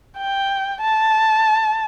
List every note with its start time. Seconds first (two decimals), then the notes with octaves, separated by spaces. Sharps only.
0.18 G5
0.82 A5